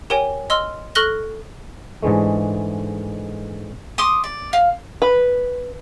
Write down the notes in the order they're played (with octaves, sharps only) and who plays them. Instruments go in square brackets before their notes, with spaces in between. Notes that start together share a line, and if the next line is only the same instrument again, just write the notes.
[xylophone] G4 A#4 C#5 G5 G#5
D#5 C6 E6 F6
A4 C#6 F6 F#6 A#6 G7
[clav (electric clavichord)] G#2 D3 E3 G#3 A3
[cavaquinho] C6 D6 D#6
D5
F5
[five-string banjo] B4